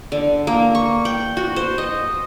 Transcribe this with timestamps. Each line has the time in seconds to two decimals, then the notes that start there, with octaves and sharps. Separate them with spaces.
0.12 D3
0.47 A#3
0.75 C#6
1.05 G5
1.37 F#4
1.56 C5
1.78 D#5